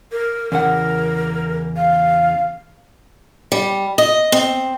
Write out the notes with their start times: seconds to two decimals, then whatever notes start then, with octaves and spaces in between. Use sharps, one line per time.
0.12 A#4
0.52 E2 C#3 A#4 F#5
1.76 F5
3.52 G3
3.98 D#5
4.32 C4